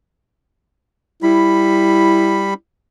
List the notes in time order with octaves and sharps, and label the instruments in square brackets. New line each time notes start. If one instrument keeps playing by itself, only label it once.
[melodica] G3 B5 [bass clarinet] E4